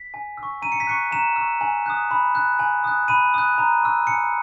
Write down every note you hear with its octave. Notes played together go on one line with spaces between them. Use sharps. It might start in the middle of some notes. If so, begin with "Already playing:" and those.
Already playing: B6
G#5
E6
C#6
A#5 D#7
C#7
B6
C#6 F#6 C#7
A#5 E7
C#6 E6
G#5
D#6 F#6
B5
F#6
G#5
D#6 F#6
B5 D#7
D#6 F#6
A#5
C#6 E6
G#5 C#7